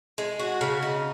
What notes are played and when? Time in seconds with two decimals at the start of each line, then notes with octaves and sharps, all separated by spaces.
0.18 G#3
0.39 F#4
0.61 C#3
0.83 D#4